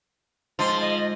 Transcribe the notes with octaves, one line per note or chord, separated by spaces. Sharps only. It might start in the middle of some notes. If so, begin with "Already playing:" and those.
G#2 F3 G#3 C6
D#5